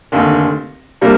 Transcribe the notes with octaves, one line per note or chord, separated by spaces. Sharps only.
F1 D#2 D3 A3
C3 G3 A#3 D4